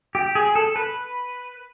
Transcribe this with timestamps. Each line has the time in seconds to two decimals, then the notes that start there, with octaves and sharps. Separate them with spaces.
0.15 G4
0.35 G#4
0.55 A4
0.76 B4